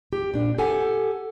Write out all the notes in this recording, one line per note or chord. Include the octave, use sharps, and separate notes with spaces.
G4
A#2 D4
G4 A4 F#5 G#5